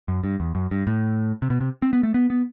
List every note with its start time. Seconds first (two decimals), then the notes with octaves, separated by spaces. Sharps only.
0.08 F#2
0.24 G2
0.40 E2
0.55 F#2
0.71 G2
0.87 A2
1.42 C3
1.50 B2
1.61 C3
1.82 C4
1.93 B3
2.03 A3
2.14 B3
2.30 B3